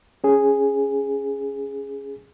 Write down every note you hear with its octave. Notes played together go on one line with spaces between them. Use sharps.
C#4 G#4